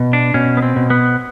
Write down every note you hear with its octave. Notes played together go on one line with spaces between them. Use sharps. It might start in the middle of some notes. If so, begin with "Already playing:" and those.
Already playing: B2
D4
B2 C#4
B3
C4
B2
B3